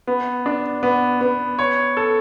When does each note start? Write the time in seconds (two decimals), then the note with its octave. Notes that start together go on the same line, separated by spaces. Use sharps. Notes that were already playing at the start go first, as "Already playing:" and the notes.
0.07 B3
0.46 D4
0.83 B3
1.21 B3
1.59 C#5
1.97 A4